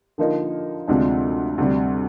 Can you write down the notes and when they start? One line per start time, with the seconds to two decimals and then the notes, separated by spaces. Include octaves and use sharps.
0.18 D3 F3 A#3 D#4
0.88 D2 C3 F3 G#3 D4
1.58 D2 C3 G3